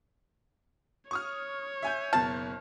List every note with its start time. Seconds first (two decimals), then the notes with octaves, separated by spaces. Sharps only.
1.11 C#5 C#6 D#6 F6
1.82 E5 G#5 G6
2.13 F#1 B2 A5 F6